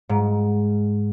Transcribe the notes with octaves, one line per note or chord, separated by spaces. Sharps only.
G#2